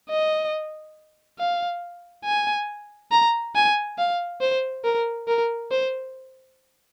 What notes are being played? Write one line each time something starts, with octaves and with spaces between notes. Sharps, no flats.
D#5
F5
G#5
A#5
G#5
F5
C5
A#4
A#4
C5